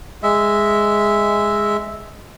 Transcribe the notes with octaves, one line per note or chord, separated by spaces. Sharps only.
G#3 E5